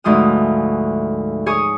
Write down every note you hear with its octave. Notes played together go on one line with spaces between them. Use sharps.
D2 G#2 E3 F3 D#6
G#4 C#5 C#6 D#6